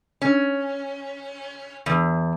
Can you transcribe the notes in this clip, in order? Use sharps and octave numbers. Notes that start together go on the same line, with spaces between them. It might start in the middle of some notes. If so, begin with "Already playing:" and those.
C#4
E2